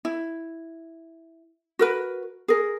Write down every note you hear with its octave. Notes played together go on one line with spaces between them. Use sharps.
E4
F#4 A#4 B4
G#4 A#4